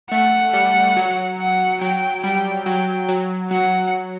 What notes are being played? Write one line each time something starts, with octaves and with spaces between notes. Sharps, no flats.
A3 F#5
G3
F#3
F#5
F#3 G5
G3 G5
F#3 G5
F#3
F#3 F#5